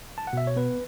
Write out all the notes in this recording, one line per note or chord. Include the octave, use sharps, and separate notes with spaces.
A5
F#5
B2 E5
C#5
B3 B4